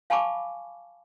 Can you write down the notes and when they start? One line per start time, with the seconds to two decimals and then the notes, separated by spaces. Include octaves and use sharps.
0.10 F5 G#5 A5 B5 C#6 D6